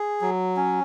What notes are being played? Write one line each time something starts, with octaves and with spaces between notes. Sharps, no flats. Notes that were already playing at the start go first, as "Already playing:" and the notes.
Already playing: G#4
F#3
C#4